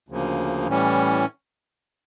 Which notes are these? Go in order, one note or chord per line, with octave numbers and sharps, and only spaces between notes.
D2 C#3 F3 A#3
A2 E3 G3 C#4